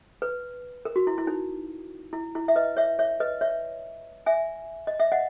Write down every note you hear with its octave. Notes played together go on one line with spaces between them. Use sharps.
B4
A#4
F#4
E4
E4
D#4
E4
E4
E5
B4 D#5
C#5 E5
C#5 E5
B4 D#5
C#5 E5
E5 G#5
D#5
E5
D#5 F#5